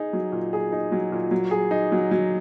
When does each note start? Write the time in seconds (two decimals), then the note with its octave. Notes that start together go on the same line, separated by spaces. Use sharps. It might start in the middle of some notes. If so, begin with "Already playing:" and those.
Already playing: D#4 G#4
0.13 F#3
0.32 A#2
0.53 G#4
0.72 D#4
0.92 F#3
1.12 A#2
1.31 F#3
1.51 G#4
1.71 D#4
1.92 F#3
2.11 F#3